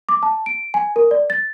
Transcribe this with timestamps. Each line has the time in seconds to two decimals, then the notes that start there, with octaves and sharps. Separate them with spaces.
0.09 D6
0.23 A5
0.46 D7
0.74 G#5
0.96 A#4
1.11 D5
1.30 A6